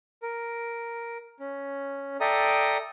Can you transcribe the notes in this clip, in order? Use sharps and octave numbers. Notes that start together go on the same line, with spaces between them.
A#4
C#4
A4 D5 E5 G5 A#5 D#6